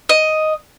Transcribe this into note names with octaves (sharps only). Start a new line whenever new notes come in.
D#5